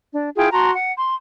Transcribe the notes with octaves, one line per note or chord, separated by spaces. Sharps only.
D4
E4 F4 G#4 G5
F#4 A5 A#5 C6
F#5
C6